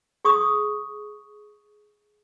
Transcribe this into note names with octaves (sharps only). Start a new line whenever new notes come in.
G#4 C#6 D#6